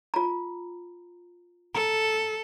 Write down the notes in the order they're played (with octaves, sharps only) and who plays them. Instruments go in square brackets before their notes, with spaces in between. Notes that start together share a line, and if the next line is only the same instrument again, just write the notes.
[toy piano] F4 A#5
[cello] A4 [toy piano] A#5